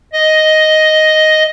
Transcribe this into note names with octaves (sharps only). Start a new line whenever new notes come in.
D#5